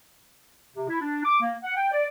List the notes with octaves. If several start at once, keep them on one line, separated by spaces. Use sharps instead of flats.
C3
E4
D4
D6
A#3
F#5
G5
D5